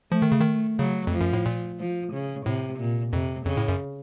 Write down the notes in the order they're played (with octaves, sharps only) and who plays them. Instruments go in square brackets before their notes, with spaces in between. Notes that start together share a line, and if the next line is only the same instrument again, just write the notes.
[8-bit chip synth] F3 [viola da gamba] A3
[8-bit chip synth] D#3
C#3
D#3
[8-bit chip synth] C#3 [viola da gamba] F#3
[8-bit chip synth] F2
[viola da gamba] F3
[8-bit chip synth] F#2
A2
A#2
[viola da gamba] F3
C#3
[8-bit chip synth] A2 [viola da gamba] C3
[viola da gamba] A#2
[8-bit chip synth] F2 [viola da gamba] C3
[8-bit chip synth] F2 [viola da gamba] C#3
[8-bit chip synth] A2
F#2